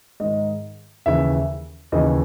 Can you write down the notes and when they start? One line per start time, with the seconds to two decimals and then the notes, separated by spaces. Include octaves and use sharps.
0.20 G#2 D#3 D#5
1.06 D#2 C#3 E3 E5
1.92 D#2 C#3 E3 D#5